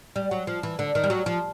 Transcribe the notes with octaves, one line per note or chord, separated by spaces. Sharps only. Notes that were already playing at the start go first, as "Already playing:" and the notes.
G3
F#3
F3
E3
D3
D#3
G3
F#3
F3